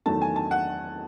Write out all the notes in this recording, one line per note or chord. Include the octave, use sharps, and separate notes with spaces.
E2 D#3 F#3 A3 A5
G#5
A5
F#5